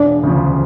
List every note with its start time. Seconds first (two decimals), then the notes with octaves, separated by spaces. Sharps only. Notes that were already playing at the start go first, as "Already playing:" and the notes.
Already playing: E1 D4
0.23 D2 C#3 F3